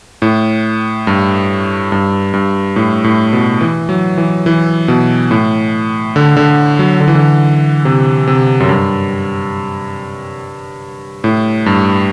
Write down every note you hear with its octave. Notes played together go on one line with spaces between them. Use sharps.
A2
G2
G2
G2
A2
A2
B2
E3
F#3
E3
E3
B2
A2
D3
D3
F#3
D3
E3
D3
C3
C3
F#2
G2
A2
G2